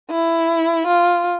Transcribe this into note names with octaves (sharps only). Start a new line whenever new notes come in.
E4
F4